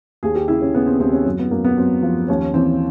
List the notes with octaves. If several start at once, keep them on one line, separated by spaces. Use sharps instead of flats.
D#2 G#4
G4
C#3 E4
C#4
C#3 B3
C4
D#2 C4
C#4
F#2
B3
F#2 A#3
B3
F#2 C4
F3
D#2 C#4
E3 C4